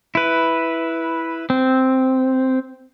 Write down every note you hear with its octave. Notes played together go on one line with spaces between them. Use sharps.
E4 B4
C4